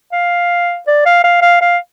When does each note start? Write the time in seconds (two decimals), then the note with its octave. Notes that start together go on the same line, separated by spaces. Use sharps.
0.13 F5
0.87 D5
1.06 F5
1.24 F5
1.42 F5
1.61 F5